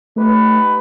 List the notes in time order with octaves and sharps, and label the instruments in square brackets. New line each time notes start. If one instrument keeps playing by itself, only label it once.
[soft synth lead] A3 [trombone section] D#4 G4 B4